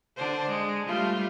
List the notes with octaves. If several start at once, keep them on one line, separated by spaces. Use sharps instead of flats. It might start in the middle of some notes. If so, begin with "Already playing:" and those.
D3 D4 C5
G#3
G3 A3 F4